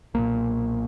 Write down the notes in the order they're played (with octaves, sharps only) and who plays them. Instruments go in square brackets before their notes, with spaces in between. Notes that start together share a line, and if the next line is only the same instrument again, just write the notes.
[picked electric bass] B1 A#2 A#3